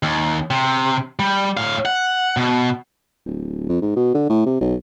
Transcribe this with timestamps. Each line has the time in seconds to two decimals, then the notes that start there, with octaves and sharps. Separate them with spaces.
0.03 D#2
0.50 C3
1.19 G3
1.57 A2 F5
1.85 F#5
2.37 B2
3.26 D1
3.69 F2
3.81 G#2
3.96 B2
4.14 D3
4.29 A2
4.46 C3
4.61 B1